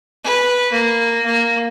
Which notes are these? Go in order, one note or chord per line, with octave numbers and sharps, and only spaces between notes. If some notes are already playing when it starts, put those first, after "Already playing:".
B4
A#3
A#3